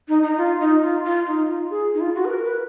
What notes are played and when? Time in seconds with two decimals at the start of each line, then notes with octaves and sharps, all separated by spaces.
0.08 D#4
0.23 D#4
0.37 F4
0.60 D#4
0.82 F4
1.04 F4
1.27 D#4
1.49 F4
1.70 G#4
1.94 D#4
2.00 F4
2.15 F#4
2.25 B4
2.30 A#4
2.45 B4